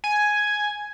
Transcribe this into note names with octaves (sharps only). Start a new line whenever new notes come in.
G#5